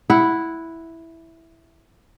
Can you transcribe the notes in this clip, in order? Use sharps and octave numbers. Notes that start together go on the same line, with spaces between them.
E4 F#5